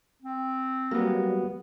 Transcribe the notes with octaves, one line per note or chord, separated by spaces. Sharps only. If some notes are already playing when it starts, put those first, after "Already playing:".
C4
F#3 G3 A#3 B3